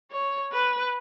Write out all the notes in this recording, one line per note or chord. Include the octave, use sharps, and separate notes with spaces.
C#5
B4